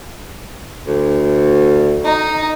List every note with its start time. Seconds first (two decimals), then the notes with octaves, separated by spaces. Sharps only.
0.87 D2
2.04 D#4